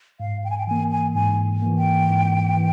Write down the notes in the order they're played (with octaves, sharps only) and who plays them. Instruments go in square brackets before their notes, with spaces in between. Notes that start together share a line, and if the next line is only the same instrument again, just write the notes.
[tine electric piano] G#2 [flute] F5
[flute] G5
G#5
G5
[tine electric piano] E3 A#3 [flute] G#5
[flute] G#5
[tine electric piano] G#2 [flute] G#5
[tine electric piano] E3 A#3
[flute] G5
[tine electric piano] G#2
E3